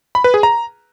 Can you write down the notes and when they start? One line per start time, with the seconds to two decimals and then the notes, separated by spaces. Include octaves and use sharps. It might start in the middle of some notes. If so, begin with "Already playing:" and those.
0.15 B5
0.24 B4
0.34 G#4
0.43 A#5